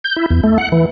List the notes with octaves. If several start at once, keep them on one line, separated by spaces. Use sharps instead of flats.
G6
E4
E2
A3
F#5
E3